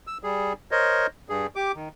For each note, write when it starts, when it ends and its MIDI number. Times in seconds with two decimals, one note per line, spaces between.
0.07 0.18 88
0.23 0.53 55
0.23 0.53 68
0.71 1.07 70
0.71 1.07 72
0.71 1.07 73
0.71 1.07 75
1.29 1.47 43
1.29 1.47 68
1.56 1.72 67
1.56 1.72 86
1.75 1.89 51